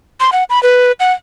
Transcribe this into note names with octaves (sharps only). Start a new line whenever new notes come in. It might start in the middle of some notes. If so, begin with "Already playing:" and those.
C6
F#5
B5
B4
F#5